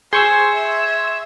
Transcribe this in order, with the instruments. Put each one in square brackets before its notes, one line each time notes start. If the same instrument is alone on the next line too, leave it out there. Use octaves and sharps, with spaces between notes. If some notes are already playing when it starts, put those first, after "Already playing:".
[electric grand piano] G#4 G6 [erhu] C5 [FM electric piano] C6 C#6 E6 [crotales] G#6
[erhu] E5